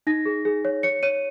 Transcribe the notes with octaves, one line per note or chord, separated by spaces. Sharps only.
D#4 A#6
G#4
G#4
C#5
C#5 C#7
C#5 D#7